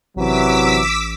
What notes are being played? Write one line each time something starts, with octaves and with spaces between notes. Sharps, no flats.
A1 C3 E3 F#3 D6 E6 B6